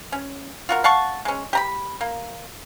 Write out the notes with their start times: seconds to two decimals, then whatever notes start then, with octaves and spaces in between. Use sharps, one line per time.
0.12 C#4
0.69 F4 F#4 A#4
0.84 F5 F#5 A5 C#6
1.25 G#3 C#4
1.53 G4 A#5 B5
2.01 A#3